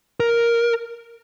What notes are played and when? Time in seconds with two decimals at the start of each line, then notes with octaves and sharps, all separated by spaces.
0.20 A#4